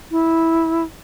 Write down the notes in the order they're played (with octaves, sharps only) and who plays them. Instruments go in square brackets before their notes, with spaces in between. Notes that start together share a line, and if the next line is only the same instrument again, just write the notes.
[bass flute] E4